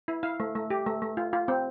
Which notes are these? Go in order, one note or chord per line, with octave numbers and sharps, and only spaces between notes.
E4
E4 F5
A3
A3
G4
A3
A3
F4
F4
C4